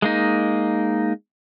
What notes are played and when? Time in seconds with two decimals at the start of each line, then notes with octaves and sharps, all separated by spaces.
0.02 G#3 A#3 D#4